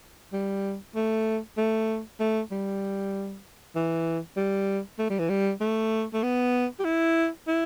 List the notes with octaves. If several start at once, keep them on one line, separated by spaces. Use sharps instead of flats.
G3
A3
A3
A3
G3
E3
G3
A3
G3
E3
G3
A3
A3
B3
G4
E4
E4